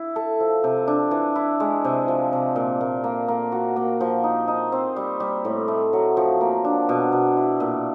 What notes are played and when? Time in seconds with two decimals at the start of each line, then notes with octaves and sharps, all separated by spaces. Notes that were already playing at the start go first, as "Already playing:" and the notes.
Already playing: E4
0.16 A4
0.40 F3
0.64 C3
0.88 D4
1.11 E3
1.36 E4
1.60 G#3
1.84 C3
2.08 F3
2.33 C3
2.56 A#2
2.81 A#2
3.04 A#3
3.28 A#3
3.52 F#4
3.76 A#3
4.01 F3
4.24 D#4
4.48 D#4
4.72 C4
4.96 G3
5.20 G3
5.45 A2
5.68 A3
5.93 F#3
6.17 F3
6.41 A#3
6.65 D4
6.89 B2
7.12 B2
7.37 E4
7.60 A#2